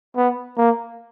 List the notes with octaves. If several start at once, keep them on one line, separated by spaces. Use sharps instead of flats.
B3
A#3